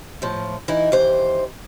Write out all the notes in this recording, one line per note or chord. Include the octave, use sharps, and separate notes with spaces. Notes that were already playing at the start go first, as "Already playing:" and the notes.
A2 F3
E3 D#4 E4
D#2 E3 C5